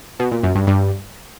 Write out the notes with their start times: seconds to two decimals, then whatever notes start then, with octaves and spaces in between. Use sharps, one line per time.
0.20 B2
0.31 A#2
0.43 F#2
0.55 G2
0.67 G2